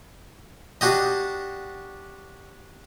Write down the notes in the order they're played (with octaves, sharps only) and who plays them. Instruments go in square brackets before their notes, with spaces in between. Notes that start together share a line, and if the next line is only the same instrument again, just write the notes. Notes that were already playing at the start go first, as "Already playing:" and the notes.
[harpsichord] D4 F#4 G4 D#5